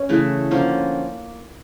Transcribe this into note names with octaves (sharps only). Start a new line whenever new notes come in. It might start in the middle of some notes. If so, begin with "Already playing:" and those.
Already playing: C#4
C#3 E3 A3
D3 F3 A#3 C#4